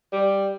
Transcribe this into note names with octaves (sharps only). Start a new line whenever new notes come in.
G3